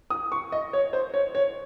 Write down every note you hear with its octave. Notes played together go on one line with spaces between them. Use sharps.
D#6
C#6
D#5
C#5
C5
C#5
C#5